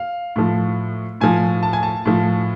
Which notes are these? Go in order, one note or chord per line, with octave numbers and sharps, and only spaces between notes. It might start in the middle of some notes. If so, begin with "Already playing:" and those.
Already playing: F5
A2 F3
A2 F3 G#5
A5
G#5
A5
A2 F3